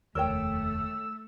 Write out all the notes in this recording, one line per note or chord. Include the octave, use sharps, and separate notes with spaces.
F1 D#2 A3 A#4 C#5 G5 E6